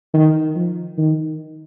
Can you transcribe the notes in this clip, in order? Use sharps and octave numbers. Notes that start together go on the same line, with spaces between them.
D#3
F3
D#3